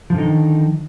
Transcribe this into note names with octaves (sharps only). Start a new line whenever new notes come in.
D3 D#3 F3 D#4